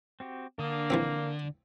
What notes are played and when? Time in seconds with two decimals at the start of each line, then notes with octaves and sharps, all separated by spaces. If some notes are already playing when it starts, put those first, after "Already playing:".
0.20 C4 F#4 G4
0.59 D3 A#3 D4 D#6
0.90 E3 F3 C4